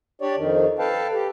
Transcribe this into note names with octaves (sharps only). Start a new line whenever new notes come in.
D4 G4 C#5 D5
F2 D#3
A4 B4 F5 G5 A5
G4